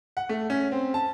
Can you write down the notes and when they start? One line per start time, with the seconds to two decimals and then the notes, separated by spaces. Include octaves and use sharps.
0.17 F#5
0.29 A3
0.50 C#4
0.72 C4
0.94 A5